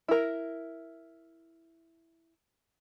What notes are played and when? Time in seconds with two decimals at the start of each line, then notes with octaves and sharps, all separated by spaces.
0.08 E4 A#4